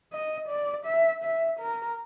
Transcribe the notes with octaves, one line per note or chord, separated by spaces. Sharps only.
D#5
D5
E5
E5
A#4